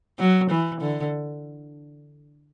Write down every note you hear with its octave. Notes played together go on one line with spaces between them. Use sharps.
F#3
E3
D3